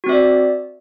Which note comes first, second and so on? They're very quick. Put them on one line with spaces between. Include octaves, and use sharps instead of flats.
F#4 C4 E5 D5